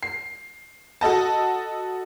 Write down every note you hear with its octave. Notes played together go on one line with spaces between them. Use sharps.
C7
F#4 A4 D#5 A5